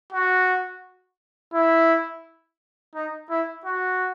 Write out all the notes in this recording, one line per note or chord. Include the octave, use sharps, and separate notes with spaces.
F#4
E4
D#4
E4
F#4